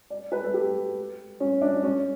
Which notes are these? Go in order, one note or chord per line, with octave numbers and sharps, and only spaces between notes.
D5
B4
A4
G4
C#4
D4
C#4